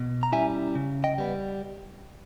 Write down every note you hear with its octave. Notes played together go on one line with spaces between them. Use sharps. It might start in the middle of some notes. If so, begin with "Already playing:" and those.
Already playing: B2
A#5
G3 C#4 E4 E5 G#5
C#3
D#5 G5
G3 B3